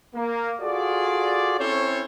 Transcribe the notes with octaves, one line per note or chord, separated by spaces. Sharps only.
A#3
F4 F#4 G#4 A4 D5
C4 C#4 E4 A4 C5 C#5